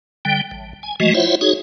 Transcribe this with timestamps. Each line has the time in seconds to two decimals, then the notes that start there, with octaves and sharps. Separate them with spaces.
0.25 D3 G3 G5
0.51 A1
0.83 G#5
1.00 E3 F3 G#3 A3 F#4 D#5
1.14 E4 F4 C5 C#5 E5 F#5
1.41 D#4 F#4 G#4 C#5